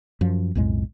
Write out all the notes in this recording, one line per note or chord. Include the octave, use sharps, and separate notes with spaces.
F#2 F3
B1 F2 A2 G#3